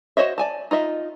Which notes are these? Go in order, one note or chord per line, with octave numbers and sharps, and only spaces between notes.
F#4 C5 C#5 D#5 E5
D5 G#5 A5
D#4 F4 D#5 E5